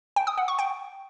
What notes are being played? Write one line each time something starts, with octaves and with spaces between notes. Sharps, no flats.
G5
D#6
F#5
C#6
G5